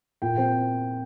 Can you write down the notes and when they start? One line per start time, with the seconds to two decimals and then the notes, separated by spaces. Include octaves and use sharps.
0.22 A#2 G5
0.37 C4 G5